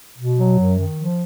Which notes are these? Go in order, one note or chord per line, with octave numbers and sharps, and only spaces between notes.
B2
F#3
F#2
D#3
F3